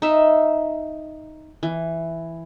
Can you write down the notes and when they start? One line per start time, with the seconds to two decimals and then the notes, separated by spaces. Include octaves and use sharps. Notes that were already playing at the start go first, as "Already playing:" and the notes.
0.02 D#4 E5
1.63 E3